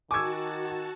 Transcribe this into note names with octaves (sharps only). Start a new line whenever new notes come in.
D#3 F#4 G#5 A5 C#6 D6 E6 G#6